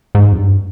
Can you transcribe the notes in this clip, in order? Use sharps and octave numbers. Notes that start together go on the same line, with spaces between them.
G#2
F2
G2